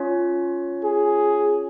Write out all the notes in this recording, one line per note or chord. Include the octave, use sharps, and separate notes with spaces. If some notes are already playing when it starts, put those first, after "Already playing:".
Already playing: C#4 F4 C#5
G#4